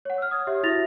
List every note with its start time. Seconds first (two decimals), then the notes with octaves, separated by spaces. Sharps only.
0.05 C#5 F#5
0.18 E6 F6
0.31 D#6 G#6
0.47 G4 C#5 E5
0.63 E4 F#4 E5 A6 A#6 F7